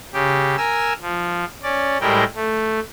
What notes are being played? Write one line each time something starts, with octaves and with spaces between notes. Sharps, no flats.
C#3 G4
A#4 G#5 E6
F3
C#4 D5
A2 G3 G#3 E4 A#4 G5
A3